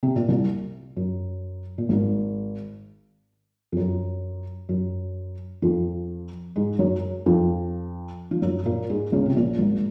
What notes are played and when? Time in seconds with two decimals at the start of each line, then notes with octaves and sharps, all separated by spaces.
0.03 C3
0.16 A#2
0.28 C2 C3
0.96 F#2
1.78 A#2
1.89 G#1 G#2
3.72 F2
3.77 F#2
4.69 F#2
5.62 F2 F3
6.56 G#2 G#3
6.79 F#2 F#3
7.26 F2 F3
8.31 F3
8.42 F#2 F#3
8.66 A#2 A#3
8.90 G#2 G#3
9.12 C#2 C#3
9.26 C3
9.36 A#1 A#2
9.59 G#1 G#2